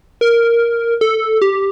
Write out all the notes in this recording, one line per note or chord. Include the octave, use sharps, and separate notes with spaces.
A#4
A4
G4